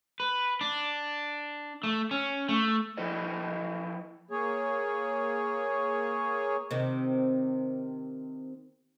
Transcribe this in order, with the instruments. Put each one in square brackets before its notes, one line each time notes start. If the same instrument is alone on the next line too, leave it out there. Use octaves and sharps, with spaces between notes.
[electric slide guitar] B4
D4
A3
C#4
A3
F3 E4 A4 B4 D5 D#5
[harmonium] A#3 G#4 C#5
[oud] C3 D#3